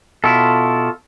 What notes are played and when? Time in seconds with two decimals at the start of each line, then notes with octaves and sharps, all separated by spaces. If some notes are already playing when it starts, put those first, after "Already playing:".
0.24 B2 E4 F4 A4